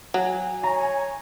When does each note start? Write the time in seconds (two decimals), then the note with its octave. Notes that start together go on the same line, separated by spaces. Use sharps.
0.14 F#3 G#5
0.63 C#5 A#5